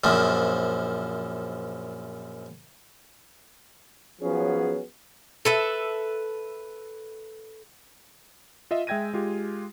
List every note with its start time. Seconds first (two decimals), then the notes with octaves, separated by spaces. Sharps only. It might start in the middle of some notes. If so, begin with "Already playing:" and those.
0.04 A#1 F#2 F3
4.22 F3 F#3 B3 C#4 G#4
5.45 A4 B4 E5
8.71 F4 D#5 E5
8.87 G#3 E5 G5 G#6 A#6 D#7
9.13 G#3 F4 G4